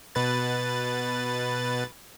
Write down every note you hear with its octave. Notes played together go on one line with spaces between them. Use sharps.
B2 B4 A6